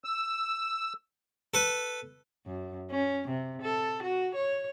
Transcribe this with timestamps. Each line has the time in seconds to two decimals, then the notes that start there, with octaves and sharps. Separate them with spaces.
0.04 E6
1.54 A4 B4
2.46 F#2
2.91 C#4
3.28 C3
3.62 A4
4.03 F#4
4.35 C#5